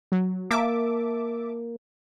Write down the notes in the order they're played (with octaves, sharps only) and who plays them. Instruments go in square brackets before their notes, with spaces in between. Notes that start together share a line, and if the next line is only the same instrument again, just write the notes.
[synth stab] F#3
[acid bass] A#3 [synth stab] E5 A5 D6